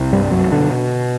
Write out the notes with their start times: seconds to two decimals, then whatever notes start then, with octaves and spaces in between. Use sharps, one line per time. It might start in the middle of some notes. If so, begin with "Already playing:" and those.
Already playing: C2 C3
0.12 G2 G3
0.24 G3
0.31 F#2 F#3
0.52 B2 D3 D4